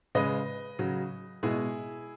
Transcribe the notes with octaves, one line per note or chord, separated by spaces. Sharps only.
C#3 G#3 B4 D#5
C#3 F#3
B2 G#3 E4 G#4